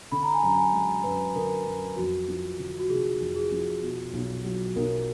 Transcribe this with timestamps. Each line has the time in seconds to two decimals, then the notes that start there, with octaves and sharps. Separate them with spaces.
0.12 D3 B5
0.23 A#5
0.34 G#5
0.43 F#2 A#5
0.58 G#5
0.73 G#3
1.04 F#2 B4
1.35 D3 A#4
1.67 F#2
1.97 F2 F#4
2.28 F3
2.59 D3
2.79 F#4
2.89 F1 G#4
3.21 F2
3.36 G#4
3.52 F3
3.82 B2
4.13 B1
4.45 F#3
4.76 B1 A#4